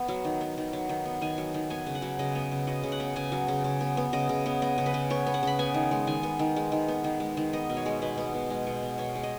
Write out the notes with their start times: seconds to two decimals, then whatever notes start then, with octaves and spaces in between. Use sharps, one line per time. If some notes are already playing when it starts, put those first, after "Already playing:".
Already playing: B3
0.08 F#3
0.25 D#3
0.41 B3
0.58 D#3
0.73 F#3
0.89 D#3
1.05 B3
1.21 D#3 G#5
1.38 F#3
1.54 D#3
1.70 B3 G#5
1.87 C#3
1.95 F#5
2.02 F#3
2.19 C#3 D#5
2.35 B3
2.51 C#3
2.67 F#3 D#5
2.84 C#3
2.92 F#5
3.00 B3
3.16 C#3 G#5
3.32 F#3
3.48 C#3
3.64 C#3
3.81 B3
3.97 B3
4.13 C#3 D#5
4.29 C#3
4.46 B3
4.62 B3 D#5
4.78 C#3
4.86 B4
4.94 C#3
5.10 B3 C#5
5.26 B3
5.34 F#5
5.43 C#3 B5
5.59 B3 G#5
5.74 D#3
5.91 G#3
6.07 D#3 G#5
6.23 B3
6.39 D#3
6.56 G#3
6.72 D#3
6.88 B3
7.04 D#3
7.20 G#3
7.37 D#3
7.53 B3 D#5
7.69 B2
7.77 C#5
7.86 G#3
8.02 B2 B4
8.18 B3
8.34 B2
8.50 G#3
8.67 B2
8.82 B3
8.98 B2 C#5
9.15 G#3
9.23 D#5